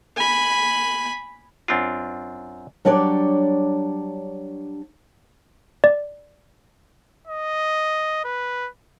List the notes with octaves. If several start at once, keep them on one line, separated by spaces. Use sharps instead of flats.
G#5 B5
F#2 C4 D4 F4
F#3 G3 D4 C#5 D5
D5
D#5
B4